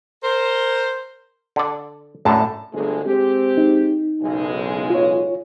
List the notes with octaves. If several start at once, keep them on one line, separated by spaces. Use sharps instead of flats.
A#4 C5
D3 D5
F#2 A2 D3 A5
G1 D2 G#3
G#3 C4 G4
D#4
F#1 B1 G#3
F4 C#5